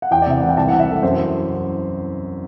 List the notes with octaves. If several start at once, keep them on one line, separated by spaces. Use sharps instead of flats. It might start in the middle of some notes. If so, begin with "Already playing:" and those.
F#5
E2 G5
D5
C3 E5
E3 F#5
G5
C2 A5
C3 F#5
E5
E3 A4
F#2 C5